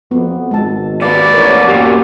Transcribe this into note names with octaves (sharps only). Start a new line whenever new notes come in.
F2 B3
G#1 G#3 A5
A#2 B4 D5
A1 A#4 C#5
F#2 B2 A#3 G4